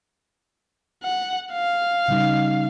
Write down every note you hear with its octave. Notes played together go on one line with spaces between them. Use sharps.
F#5
F5
C#3 G3 D#4